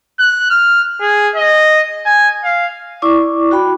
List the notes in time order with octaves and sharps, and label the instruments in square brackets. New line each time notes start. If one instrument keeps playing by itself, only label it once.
[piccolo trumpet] F#6
F6
G#4
D#5
G#5
F5
[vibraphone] E4 D5 C#6 D6
F#4 G5 B5